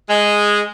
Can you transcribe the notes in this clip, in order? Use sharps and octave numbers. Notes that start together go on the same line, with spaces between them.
G#3